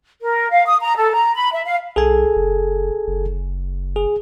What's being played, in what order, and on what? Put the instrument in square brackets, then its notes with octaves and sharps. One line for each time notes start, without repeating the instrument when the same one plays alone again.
[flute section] A#4
F5
D#6
A#5
A4
A#5
B5
E5
F5
[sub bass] B1 [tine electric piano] G#4 A4 G#5
[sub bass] F#1
F#1
[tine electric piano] G#4